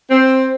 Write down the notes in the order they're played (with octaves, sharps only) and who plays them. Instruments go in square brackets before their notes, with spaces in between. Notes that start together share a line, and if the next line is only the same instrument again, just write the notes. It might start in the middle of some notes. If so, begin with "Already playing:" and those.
[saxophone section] C4